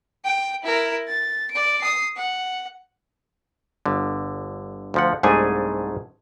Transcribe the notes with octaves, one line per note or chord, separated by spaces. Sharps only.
G5 D7
E4 A#4
A6
D5 D7
D#6 C7
F#5
G1 D3
D2 F3 F#5
C2 G#2 A3 D4 G#4 G#5